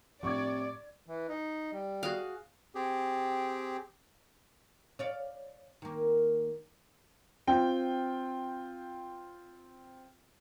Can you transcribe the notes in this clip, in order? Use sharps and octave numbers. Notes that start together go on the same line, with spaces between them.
A2 C3 F3 D5 C#6 D6 G#6
E3
D#4
G3
F#4 G#4 F5
C4 G4 G#4
C#5 D5 F5
D#3 A#3
C4 F4 G5